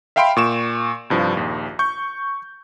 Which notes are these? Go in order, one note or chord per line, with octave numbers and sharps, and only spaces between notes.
E5 F5 G5 B5 C6 D7
A#2 C#6 E7
C2 G2 F3
A#1 D#2
C#6 G6